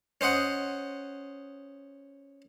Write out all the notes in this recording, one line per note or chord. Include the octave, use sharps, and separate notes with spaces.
C#4 C5 D#5 F#5